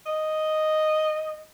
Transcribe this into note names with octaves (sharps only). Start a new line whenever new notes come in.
D#5